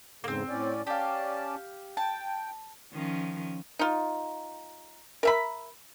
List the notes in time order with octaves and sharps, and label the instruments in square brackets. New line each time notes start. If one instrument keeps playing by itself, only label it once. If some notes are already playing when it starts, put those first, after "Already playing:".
[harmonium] E2 G#2 C#3 [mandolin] A#3 C4
[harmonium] A2 C#4 D5
[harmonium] C#4 D5 A5 [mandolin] G4 F5
[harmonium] G5 [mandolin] A5
[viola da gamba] D#3 F3 C#4
[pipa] D#4 F4
A#4 E5 B5